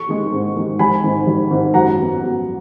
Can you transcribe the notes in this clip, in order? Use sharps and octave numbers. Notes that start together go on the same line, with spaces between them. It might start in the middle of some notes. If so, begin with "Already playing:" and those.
Already playing: C#6
D#3 G#3
G#2
D#3 G#3
G#1 G#5 B5
G#2 D#3
G#1
G#2 D#3
F#2 F#5 A#5
F3 B3
F#2